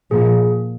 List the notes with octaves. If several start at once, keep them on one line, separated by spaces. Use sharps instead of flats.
A#2 F3 G#4